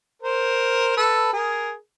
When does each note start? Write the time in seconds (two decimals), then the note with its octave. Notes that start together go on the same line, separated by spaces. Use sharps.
0.23 A#4 C5
0.96 A4 B4
1.33 G#4 A#4